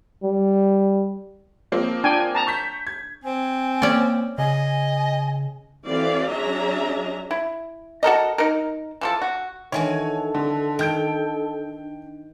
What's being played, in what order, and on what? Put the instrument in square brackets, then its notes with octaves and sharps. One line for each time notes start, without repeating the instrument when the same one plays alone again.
[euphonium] G3
[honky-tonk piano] F3 A#3 C4
[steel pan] D4 G5 G#5
A5 A#5
[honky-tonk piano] C#6 G6 B6
G#6
[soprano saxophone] C4 [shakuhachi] G#5
[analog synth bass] A#3 [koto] C#4 D5
[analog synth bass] C#3 [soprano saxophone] D#5 [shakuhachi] G#5
[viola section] E3 C4 F#4 A4 D5 F5
F#3 C#4 D4 G#4 E5 A#5
[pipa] E4
F#4 A4 A#4 D#5
D#4 A#4
E3 F3 A4
F#4
[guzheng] D#3 E3 F#4 [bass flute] D4 [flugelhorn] A4 [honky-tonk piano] C#5 G#5
[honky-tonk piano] D3
[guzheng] D#3 [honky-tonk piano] G5 G6 D7